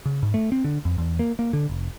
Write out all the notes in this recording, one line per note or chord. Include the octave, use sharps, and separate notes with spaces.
C#3
G#2
A3
C4
D3
F2
E2
A#3
A#3
D3
F1